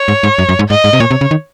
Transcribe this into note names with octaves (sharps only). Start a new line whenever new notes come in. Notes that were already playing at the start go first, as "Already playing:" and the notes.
Already playing: C#5
G#2
G#2
F#2
F#2
G#2
G#2 D#5
G#2
C3
A#2 C#5
C3
C#3
D#3